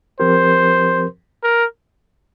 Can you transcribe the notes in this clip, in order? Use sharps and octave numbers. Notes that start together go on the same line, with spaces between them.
F3 C4 G4 A#4 C5
A#4